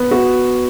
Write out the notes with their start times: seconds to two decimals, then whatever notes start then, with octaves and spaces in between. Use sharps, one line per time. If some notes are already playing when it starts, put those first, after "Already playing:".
Already playing: B3
0.11 F#4